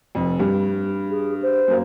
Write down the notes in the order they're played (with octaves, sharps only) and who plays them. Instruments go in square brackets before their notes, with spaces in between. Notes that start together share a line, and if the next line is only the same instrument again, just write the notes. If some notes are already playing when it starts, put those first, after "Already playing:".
[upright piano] F1 F2
G2
[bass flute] G#4
C5
[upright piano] F#2 A#3